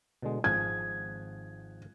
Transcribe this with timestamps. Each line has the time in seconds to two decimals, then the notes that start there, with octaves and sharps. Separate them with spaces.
0.22 B2 D3 G#3
0.44 G#1 F3 G#4 G#6